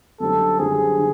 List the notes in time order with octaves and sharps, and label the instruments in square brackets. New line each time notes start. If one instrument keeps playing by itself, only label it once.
[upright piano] F#2 D3 G3 C4 [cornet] A4
[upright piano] F#2 D3 G3 C4 [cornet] G#4
[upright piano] D3